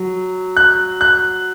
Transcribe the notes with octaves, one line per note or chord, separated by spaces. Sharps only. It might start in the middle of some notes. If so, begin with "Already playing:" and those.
Already playing: F#3
F#6
F#6